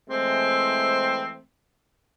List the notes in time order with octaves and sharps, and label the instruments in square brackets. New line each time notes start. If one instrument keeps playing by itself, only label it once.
[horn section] E3 G#3 A3 C4